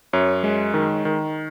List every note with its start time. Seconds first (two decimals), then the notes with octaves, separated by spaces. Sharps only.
0.13 F#2 C#5
0.43 G#3
0.74 D#3
1.05 D#3